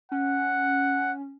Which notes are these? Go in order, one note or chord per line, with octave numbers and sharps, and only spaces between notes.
C#4 F#5